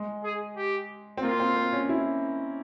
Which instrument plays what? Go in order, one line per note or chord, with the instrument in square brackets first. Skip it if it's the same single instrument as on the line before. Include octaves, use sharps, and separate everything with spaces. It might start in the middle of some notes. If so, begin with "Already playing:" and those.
Already playing: [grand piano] G#3
[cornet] G#4
G4
[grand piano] C4
[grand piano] A#3 [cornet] F4
[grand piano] C4
C4
C#4
E4